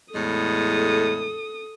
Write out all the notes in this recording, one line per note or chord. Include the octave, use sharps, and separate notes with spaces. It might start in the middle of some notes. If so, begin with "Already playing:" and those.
E2 A2 G#3 A4 D#6